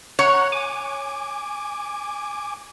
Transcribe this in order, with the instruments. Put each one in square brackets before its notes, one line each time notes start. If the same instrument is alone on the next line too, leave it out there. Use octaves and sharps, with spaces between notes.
[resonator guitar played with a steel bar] C#5 [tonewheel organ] F#5 A#5 F#6
[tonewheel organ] G#5 D6